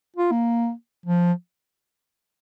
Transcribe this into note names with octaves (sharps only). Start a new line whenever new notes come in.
F4
A#3
F3